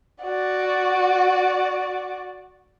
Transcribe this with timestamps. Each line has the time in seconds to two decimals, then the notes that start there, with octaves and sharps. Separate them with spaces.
0.24 F#4 D5